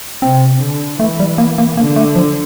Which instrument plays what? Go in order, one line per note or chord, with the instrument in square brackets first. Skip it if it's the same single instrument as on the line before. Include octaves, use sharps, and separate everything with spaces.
[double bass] C3 [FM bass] C4
[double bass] D3
[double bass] E3 [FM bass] A3
[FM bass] G3
A#3
A#3
[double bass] D3 [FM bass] A#3
[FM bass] A3
F3